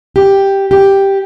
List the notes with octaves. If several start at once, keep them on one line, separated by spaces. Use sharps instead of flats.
G4
G4